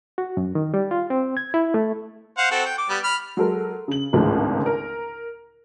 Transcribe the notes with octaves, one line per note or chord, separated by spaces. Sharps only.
F#4
F#2
D#3
G3
F4
C4
G#6
E4
A3
C5 F5 F#5
C4 F#4 A4
G5
D6
G3 B3
B5 F6
F#3 G#3 A4 A#4
C#3 F#7
G#1 C#2 A2 D3 F3 G#3
A#4